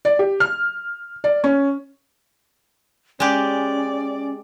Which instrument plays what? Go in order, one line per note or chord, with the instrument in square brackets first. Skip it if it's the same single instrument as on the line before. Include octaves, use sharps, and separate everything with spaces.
[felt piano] D5
G4
F6
D5
C#4
[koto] G#3 G4 [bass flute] C#4 [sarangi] D5